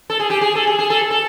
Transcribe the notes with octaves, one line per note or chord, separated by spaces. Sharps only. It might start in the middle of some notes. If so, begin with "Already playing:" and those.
A4
G#4
G4
G#4
A4
G#4
G#4
A4
A4